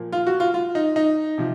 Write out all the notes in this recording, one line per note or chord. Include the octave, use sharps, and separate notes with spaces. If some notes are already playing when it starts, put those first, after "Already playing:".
Already playing: A#2 F3 A#3
F4
F#4
F4
F4
D#4
D#4
C3 F3